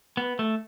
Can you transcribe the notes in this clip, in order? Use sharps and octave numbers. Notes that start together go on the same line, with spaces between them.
B3
A3